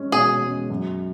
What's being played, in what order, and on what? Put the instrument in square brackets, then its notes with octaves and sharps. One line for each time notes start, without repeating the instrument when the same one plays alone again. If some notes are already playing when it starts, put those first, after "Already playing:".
Already playing: [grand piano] G#3 C#4
[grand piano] B2 [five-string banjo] G#4
[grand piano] G#3 C#4
F#2